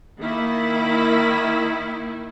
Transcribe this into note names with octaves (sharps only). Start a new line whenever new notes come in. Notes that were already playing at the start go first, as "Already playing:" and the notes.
D#3 A#3 E4